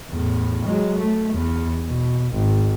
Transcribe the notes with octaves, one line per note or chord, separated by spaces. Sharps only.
E2 A2
F#3 G#3
A3
E2
B2
G#1